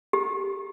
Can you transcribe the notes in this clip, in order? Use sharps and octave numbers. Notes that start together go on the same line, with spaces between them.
G4